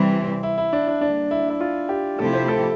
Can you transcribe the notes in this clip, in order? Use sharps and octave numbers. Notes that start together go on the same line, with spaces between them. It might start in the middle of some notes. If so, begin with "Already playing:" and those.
Already playing: C3 E3 G3 C4
E4
E4
D4
D4
D3 G3 A#3 D4
E4
E4
F4
G4
C3 F3 A3 E4 G4 A4
C5
A4